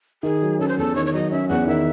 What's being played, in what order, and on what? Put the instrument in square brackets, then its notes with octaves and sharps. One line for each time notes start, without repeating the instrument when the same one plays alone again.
[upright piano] D#3 [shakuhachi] G#4
[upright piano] F#3
[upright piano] C#4 [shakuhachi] A4
[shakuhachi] C5
[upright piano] E2 [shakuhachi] A4
[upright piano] D#3 [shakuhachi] C#5
[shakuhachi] C#5
[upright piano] F#3 [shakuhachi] D#5
[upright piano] C#4 [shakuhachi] E5
[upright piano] E2 [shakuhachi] F#5
[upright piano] D#3 [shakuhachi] E5